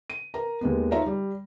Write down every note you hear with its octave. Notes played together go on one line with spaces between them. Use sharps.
D#7
A#4 A#5
D#2 G#3 B3
D#4 F4 C#5 E5 A#5
G3